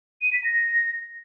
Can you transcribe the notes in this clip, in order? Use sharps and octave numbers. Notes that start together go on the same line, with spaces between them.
D#7
B6
A#6